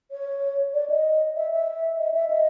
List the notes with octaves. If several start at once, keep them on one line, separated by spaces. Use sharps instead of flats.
C#5
D5
D#5
E5
E5
D#5
E5
D#5